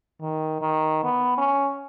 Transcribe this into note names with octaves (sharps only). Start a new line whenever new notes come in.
D#3
D#3
B3
C#4